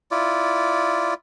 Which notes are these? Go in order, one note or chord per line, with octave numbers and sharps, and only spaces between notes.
E4 F4 D5